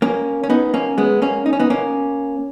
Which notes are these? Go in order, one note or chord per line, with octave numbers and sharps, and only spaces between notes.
A#3 C#4
C#4
B3 D#4
A#3 C#4
G#3 B3
A#3 C#4
D#4
C#4
B3 D#4
A#3 C#4